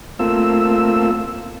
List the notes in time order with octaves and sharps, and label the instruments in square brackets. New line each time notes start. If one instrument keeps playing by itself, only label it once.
[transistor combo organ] A3 A#3 C4 F4 E6